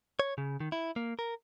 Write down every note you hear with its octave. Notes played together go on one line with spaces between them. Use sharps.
C#5
C#3
D#3
E4
A#3
A#4